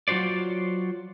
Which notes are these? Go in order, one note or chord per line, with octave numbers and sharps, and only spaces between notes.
F#3 F4 F#4 C5 D5